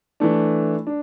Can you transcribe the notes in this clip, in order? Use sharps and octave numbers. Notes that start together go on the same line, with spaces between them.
E3 A3 D4
D4